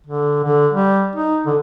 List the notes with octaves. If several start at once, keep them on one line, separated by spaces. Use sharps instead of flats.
D3
D3
G3
D#4
D3